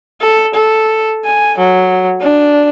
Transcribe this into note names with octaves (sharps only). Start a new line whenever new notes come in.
A4
A4
G#5
F#3
D4